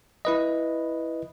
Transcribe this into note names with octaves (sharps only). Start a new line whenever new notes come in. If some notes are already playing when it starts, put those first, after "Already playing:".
E4 B4 D#5